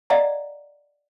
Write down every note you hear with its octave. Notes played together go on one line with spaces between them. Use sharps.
D5 D#5 F5 F#5 A#5